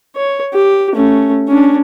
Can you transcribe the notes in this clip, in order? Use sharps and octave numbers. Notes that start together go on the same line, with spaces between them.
C#5
G4
A3 C#4
C#4 D4